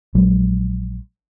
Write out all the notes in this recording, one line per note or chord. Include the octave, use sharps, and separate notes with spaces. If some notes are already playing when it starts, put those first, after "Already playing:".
A#1 F#3 G#3